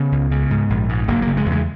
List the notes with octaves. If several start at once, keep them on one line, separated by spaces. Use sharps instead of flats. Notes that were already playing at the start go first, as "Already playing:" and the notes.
Already playing: C#3 B3
C#2
C#3
G#2
A#1
G#2
F#1 A#3
A#3
C#3
G#3
E2
G#3